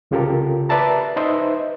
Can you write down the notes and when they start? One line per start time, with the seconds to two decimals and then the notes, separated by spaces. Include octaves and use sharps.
0.11 C2 C#3 F4 G4 A4 A#4
0.69 B4 D5 E5 A5 A#5
1.16 D#4 B4 C5 D#5 E5